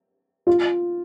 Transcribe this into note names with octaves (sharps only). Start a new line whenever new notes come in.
F4